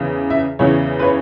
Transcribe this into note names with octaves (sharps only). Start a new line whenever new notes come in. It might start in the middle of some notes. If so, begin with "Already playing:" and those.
Already playing: E2 C#3 E3
E5
E2 C#3 E3 C#5
B4
C#5